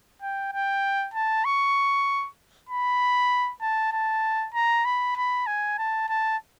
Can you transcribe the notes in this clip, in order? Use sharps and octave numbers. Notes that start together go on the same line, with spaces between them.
G5
G5
A5
C#6
B5
A5
A5
A#5
B5
B5
G#5
A5
A5